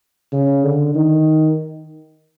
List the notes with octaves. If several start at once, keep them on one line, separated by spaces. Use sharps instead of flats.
C#3
D3
D#3